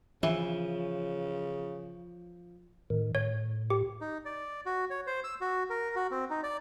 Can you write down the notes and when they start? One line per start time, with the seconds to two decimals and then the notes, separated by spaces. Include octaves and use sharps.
0.23 C#3 E3 F3
2.90 A2 D#3
3.15 A2 C#5
3.70 G4
4.01 D#4
4.25 D5
4.66 F#4
4.90 C#5
5.07 C5
5.24 E6
5.41 F#4
5.70 A#4
5.96 F#4
6.11 C4
6.30 D#4
6.43 D5